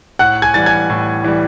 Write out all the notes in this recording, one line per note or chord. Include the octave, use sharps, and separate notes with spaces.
A2 F#5 F#6
G#5 G#6
E3 G3 A6
G#5 G#6
A2
E3 G3